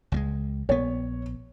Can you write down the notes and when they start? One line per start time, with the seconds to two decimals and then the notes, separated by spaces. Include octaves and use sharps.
0.12 C#2 G3 G#3
0.69 A#1 B3 C#5